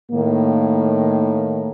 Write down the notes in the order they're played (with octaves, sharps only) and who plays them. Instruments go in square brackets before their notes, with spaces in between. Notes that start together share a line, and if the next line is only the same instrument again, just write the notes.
[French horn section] A2 D#3 A#3